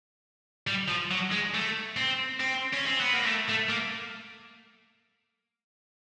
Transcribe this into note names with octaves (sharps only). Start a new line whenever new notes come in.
G3
F3
F#3
G#3
A3
C4
C4
C#4
C4
B3
A#3
A3
A3
A#3